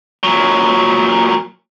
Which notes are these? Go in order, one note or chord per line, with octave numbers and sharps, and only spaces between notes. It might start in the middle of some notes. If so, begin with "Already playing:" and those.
A#2 F#3